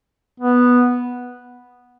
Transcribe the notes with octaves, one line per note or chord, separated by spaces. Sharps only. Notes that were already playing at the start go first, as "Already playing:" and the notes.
B3